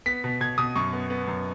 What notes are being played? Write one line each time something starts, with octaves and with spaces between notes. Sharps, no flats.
B3 B6
B2
B2 G#6
B2 D#6
F#2 C#6
B3
B3
F#2